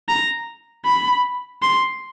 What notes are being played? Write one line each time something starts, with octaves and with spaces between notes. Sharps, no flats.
A#5
B5
C6